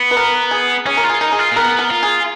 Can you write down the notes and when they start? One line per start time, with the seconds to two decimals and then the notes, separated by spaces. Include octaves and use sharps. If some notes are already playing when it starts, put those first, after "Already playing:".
Already playing: B3
0.11 B4
0.17 A#4
0.51 G#4
0.86 C#4 G#4
0.97 A#4
1.04 F4
1.09 G#4
1.21 D#4 A#4
1.32 G#4
1.39 F4
1.51 A#3
1.56 B3 A#4
1.79 A#4
1.91 F4
2.03 G#4